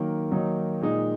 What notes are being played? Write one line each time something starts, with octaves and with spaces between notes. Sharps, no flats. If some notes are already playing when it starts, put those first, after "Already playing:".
Already playing: D#3 F#3 A#3
D#3 F#3 A#3 D#4
A#2 G#3 D#4